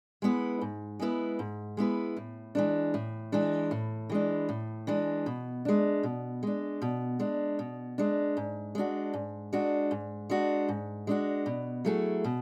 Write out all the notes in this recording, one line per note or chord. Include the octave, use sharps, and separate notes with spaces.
G#3 B3 E4 B4
G#2
G#3 B3 E4 B4
G#2
G#3 B3 E4 B4
A2
E3 G#3 D4
A2
E3 G#3 D4
A2
E3 G#3 D4
A2
E3 G#3 D4
B2
G#3 D4
B2
G#3 D4
B2
G#3 D4
B2
G#3 D4
G#2
G#3 D4 F#4
G#2
G#3 D4 F#4
G#2
G#3 D4 F#4
G#2
G#3 D4 F#4
B2
F#3 A3 E4 G#4
B2